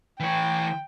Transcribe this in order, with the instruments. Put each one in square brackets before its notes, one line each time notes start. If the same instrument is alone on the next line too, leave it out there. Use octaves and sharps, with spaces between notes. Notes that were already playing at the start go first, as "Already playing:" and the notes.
[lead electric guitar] E3 C#5 [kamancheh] G5